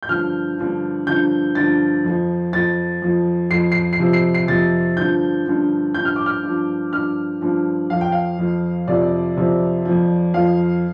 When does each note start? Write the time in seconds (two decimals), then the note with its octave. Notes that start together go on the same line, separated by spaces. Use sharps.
0.03 G6
0.09 G2 D3 F3 F6
0.58 G2 D3 F3
1.07 G2 D3 F3 G6
1.55 G2 D3 F3 A6
2.04 F2 F3
2.53 F2 F3 A6
3.02 F2 F3
3.50 F2 F3 C7
3.72 C7
3.93 C7
4.00 F2 C3 F3
4.13 C7
4.34 C7
4.48 F2 C3 F3 A6
4.97 G2 D3 F3 G6
5.46 G2 D3 F3
5.94 G2 F3 G6
6.05 F6
6.16 D6
6.26 F6
6.43 G2 F3
6.93 G2 F3 F6
7.41 G2 F3
7.90 F2 F3 F5
8.01 G5
8.12 F5
8.39 F2 F3
8.87 F2 C3 F3 D5
9.37 F2 C3 F3
9.85 F2 F3
10.34 F2 F3 F5